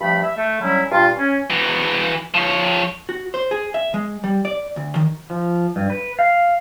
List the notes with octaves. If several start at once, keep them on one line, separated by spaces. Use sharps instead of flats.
G2 F3 A3 B5
E5
A3
D3 F#3 G3 C#4 E4
G2 A#2 F4
C#4
E3 F#4
F3 C#5
F#4
C5
G#4
E5
G#3
G3
D5
D2
D#3
F3
G2
B4
F5